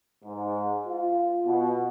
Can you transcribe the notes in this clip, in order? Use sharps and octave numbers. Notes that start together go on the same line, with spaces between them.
G#2
F4
B2